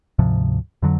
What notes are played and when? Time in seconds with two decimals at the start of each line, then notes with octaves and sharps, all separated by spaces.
0.19 D2 G#2 C3 F3
0.82 F2 D3 F#3